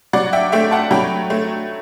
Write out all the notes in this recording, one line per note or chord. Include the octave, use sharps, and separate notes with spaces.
F#3 D5 F#5
E5 G5
A3 E5 G5
F#5 A5
F#3 G5 B5
A3